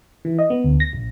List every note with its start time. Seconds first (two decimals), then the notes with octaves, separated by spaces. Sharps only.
0.25 E3
0.38 D#5
0.50 B3
0.64 D2
0.80 A#6
0.93 A#1